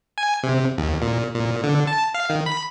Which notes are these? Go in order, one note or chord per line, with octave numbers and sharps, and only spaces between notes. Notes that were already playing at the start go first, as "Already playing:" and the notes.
G#5
C3
D#2
A#2
A#2
D3
A5
F5
D#3
B5